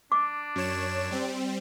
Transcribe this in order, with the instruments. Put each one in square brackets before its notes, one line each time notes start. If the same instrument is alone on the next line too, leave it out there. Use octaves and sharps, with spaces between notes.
[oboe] D4 [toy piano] D6
[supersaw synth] F#2 C#5 E7
G3 C4